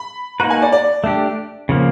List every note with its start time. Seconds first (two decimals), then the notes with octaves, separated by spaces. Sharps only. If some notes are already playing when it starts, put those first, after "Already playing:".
Already playing: B5
0.39 A#3 D#4 F#4 B4 A#5
0.50 G#5
0.62 D5
0.72 D5
1.04 A3 D4 G4
1.69 C#3 F3 A#3